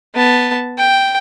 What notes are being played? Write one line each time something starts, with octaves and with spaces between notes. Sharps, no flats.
B3 A5
G5